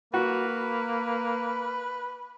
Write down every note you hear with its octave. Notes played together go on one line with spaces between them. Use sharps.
A#3 F#4 B4